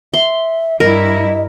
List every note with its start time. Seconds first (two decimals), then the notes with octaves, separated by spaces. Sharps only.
0.14 E5 C6
0.80 G2 E4 A#4 D#5